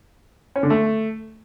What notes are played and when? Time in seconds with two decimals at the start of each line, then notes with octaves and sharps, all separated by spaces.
0.56 C#4
0.63 D3
0.70 A3